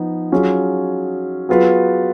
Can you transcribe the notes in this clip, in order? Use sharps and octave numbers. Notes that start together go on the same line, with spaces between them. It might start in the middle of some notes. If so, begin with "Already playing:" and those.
Already playing: F3 B3 D#4
F#3 C#4 F4 G#4
F#3 B3 F4 G#4 B4